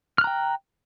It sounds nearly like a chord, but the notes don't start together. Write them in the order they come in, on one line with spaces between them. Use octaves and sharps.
F6 F#6 A#5 G5